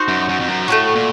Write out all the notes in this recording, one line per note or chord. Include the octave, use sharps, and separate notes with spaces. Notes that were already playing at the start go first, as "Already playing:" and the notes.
Already playing: D#4 F#4 C5
F#2
F#2
F2
F#2
A2 A3 C#4 F#4
A#2